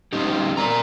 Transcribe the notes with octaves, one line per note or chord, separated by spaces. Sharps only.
G3 C4 C#4 D#4 G4
A#4 D5 A#5